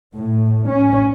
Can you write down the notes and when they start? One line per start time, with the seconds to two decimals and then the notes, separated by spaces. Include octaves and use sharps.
0.15 A2
0.69 C#4